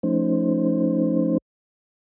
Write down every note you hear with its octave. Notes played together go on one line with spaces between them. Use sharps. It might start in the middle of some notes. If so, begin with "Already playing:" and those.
F3 A3 C#4 D#4 C5